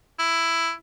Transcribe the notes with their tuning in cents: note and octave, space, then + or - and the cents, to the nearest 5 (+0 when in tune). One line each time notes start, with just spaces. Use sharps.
E4 +10